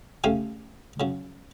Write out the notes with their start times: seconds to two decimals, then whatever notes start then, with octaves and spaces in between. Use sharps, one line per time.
0.24 C#3 A3 G4 F5 G#5
1.00 C#3 F#3